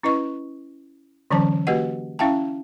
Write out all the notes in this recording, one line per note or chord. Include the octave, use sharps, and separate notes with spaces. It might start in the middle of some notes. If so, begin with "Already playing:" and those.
C#4 E4 B4 D#5 C#6
D3 E3 F#3 C#4 C5 A5
A#3 F#4 G4 B4 D#5 F#5
C#4 E4 E5 F5 G5 A5